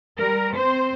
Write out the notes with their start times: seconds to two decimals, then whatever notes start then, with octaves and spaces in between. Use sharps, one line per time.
0.18 G3 A#4
0.54 C4 C5